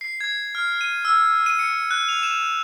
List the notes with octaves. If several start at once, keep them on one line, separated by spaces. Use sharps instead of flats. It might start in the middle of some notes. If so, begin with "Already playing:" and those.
C7
G#6
F6
D#7
E6
D#7
C#7
F#6
F7
E7